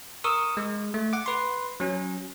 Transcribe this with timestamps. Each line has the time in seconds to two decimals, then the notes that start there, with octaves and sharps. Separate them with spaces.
0.24 A#4 C#6 D#6 E6
0.57 G#3
0.94 A3
1.13 F#5 D6
1.26 B4 C6
1.80 F#3 C#4